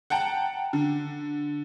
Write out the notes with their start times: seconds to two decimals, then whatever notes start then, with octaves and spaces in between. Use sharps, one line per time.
0.10 F#5 G5 A5 A#5
0.73 D3